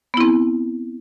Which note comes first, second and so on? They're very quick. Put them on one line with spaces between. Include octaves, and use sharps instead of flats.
B3 E4 C4